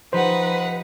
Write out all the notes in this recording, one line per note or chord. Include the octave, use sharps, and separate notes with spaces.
F3 D#4 G4 B4 C5 D#5 F#5